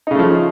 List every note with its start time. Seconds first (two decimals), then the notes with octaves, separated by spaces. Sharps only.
0.07 D#4
0.11 C#3
0.15 A3
0.19 F3